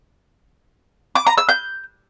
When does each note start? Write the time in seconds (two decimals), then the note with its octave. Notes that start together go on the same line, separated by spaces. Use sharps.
1.15 D6
1.27 A#5
1.38 E6
1.49 G6